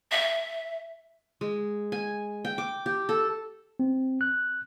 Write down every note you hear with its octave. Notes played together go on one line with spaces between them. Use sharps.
E5
G#3
G#5
G5
D6
G4
A4
C4
F#6